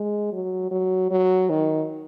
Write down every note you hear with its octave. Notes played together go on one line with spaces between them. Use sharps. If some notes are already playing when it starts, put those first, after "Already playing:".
Already playing: G#3
F#3
F#3
F#3
D#3